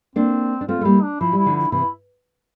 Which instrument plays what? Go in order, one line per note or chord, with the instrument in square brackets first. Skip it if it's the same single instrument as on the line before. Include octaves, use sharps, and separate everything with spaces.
[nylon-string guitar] A#3 D4 [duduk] C4
[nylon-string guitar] D4
[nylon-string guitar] A3 C4 [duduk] F4
[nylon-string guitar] A3
[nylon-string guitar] G3 A#3 [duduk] E4
[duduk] D4
[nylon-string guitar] F3 [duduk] E4
[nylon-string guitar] G3
[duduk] E4
[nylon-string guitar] D3 F3
[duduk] E4
[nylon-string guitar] C3 E3 [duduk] E4